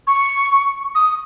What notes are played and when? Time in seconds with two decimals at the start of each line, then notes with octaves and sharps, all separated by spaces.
0.07 C#6
0.95 D#6